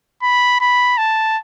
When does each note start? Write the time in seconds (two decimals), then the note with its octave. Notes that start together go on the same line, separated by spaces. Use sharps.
0.22 B5
0.61 B5
0.98 A5